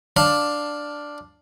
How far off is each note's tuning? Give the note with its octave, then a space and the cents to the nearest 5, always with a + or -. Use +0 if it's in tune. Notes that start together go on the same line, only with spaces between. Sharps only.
D4 +0 F5 +10 A5 +10